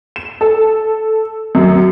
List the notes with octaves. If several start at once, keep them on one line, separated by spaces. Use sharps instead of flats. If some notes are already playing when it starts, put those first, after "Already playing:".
E7
A4
F#2